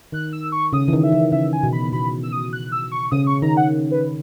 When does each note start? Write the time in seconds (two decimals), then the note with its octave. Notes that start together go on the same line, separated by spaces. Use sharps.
0.12 D#3 F#6
0.33 E6
0.52 C#6
0.73 C#3 D#6
0.88 E3
0.93 D#3
1.03 E5
1.12 E3
1.32 C#3 E5
1.53 G#5
1.63 B2
1.73 B5
1.92 B2 B5
2.23 E6
2.32 D#6
2.53 F#6
2.72 E6
2.92 C#6
3.11 C#3 D#6
3.27 C#6
3.42 D#3 A#5
3.57 F#5
3.91 B4